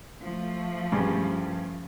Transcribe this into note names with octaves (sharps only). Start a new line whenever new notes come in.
F3 A3
G2 C#3